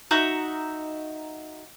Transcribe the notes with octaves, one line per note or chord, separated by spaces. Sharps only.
D#4 F#4 E5 A#5